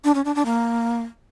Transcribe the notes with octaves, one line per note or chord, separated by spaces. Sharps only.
D4
C#4
D4
D4
A#3